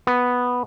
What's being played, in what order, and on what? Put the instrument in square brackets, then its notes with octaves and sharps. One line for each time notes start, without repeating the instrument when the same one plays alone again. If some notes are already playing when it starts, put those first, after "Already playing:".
[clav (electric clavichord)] B3